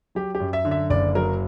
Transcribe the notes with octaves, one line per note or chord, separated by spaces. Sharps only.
F#3 G4
G4
F#2
E5
D3
E5
F#1 D5
F#3 A#4